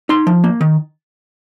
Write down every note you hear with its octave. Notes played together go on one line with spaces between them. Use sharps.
D#4 C6
F3
A#3
D#3